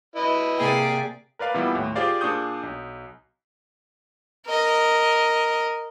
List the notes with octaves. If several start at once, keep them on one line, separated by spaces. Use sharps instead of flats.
E4 B4 D#5 B5
C3 A#3 G#4 D5 G5
A#4 B4 D5 F5 B5
A#2 E3 G3 B3 E4
D#2 A2
F4 G4 G#4 C5 D5 F5
A#2 D4 G#4 C#6 D#6 G6
B1
A#4 D#5